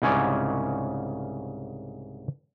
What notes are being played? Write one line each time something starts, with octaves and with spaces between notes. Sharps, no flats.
C2 G#2 C#3 C#4 C#5 D5